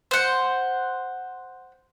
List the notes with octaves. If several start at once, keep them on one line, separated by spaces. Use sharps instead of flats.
C5 F#5